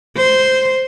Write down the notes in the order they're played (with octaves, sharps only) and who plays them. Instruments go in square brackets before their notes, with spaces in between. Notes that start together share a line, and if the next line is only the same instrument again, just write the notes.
[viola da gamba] C5